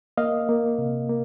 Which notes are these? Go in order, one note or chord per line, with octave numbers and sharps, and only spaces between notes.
A#3 D#5 F5
A#3
C3
A#3